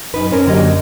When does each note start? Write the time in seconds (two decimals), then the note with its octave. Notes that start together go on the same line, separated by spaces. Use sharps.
0.14 F#2 D#4 B4
0.31 C4 C#4 A#4
0.46 F#2 D3 F#3 A#3 G4 D#5